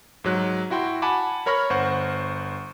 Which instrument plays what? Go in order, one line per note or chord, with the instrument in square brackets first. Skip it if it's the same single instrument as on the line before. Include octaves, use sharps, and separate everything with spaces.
[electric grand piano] G#2 F#3 F#6
E4 F#4 G5 C6
F#5 G#5 A5 B5 D6
A#4 C#5 B5 C#6 F6 A#6
G1 C5 F#5 C#6